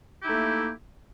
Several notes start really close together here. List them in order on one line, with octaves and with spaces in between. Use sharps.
G4 E4 D#4 A3 A#3